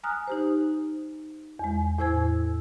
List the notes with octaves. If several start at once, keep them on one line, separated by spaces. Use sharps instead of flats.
G#5 A#5 D#6 F6 F#6
D#4 G4 C5
E2 G#3
E2 A2 E4 C5 E6 G#6